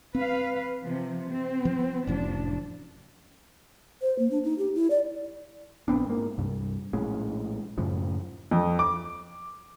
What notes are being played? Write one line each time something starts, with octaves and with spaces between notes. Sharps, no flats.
C4 B4 F5
C3 F3
C4
F3
F1 A2 F3 F#3 C#4 D4
C5
A#3
D4
D#4
G4
E4
D5
A#1 B3 C4 D4
G#2 A#3
C2 G2
A#1 A2 G#3 C#4
F#2 A2 C#3 F3
F2
D6